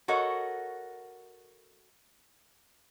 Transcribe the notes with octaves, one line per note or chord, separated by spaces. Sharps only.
F#4 A4 A#4 C#5 D#5 F#5